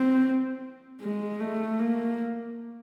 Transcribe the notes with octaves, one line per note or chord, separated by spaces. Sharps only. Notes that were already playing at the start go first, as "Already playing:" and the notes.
Already playing: C4
G#3
A3
A#3